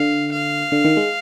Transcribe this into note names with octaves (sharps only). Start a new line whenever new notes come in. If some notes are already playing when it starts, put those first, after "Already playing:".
Already playing: D3 F5
F5
D3
D#3
G#3